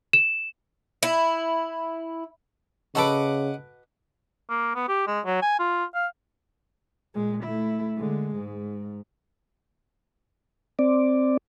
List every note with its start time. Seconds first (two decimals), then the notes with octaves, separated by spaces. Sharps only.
0.13 E7
1.03 E4
2.95 C#3 F#4 A4 B4 D#5 F#5 D6
4.50 A#3
4.75 B3
4.88 G4
5.07 G#3
5.26 F#3
5.42 G#5
5.59 F4
5.94 F5
7.14 A#2 G#3
7.44 A3 E4
7.97 D3 G#3
8.36 G#2
10.79 C4 D5